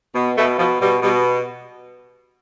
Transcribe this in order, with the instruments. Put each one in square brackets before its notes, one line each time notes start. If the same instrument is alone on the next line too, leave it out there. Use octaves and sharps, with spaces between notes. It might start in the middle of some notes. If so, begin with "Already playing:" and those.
[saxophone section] B2
B2 A3
B2 F3
B2 G3
B2 G3